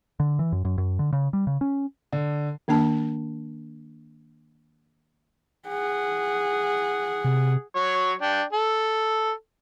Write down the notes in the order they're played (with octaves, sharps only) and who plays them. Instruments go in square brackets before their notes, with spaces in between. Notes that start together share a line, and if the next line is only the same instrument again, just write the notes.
[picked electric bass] D3
E3
F#2
F#2
F#2
D3
C#3
G3
C#3
C#4
[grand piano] D3
[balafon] D#3 A#3 D4 A5
[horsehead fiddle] G#4 F#5
[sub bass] C3
[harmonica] F#3 C#5
D4 G5
A4